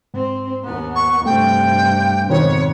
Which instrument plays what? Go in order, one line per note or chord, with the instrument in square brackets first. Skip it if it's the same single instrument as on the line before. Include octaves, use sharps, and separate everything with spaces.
[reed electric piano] G#2 [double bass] C4
[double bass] D#2 B3
[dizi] C#6
[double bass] G2 C3 [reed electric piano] A3 [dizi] G5
[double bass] G#1 F2 [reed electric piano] B2 D#3 C4 [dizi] C#5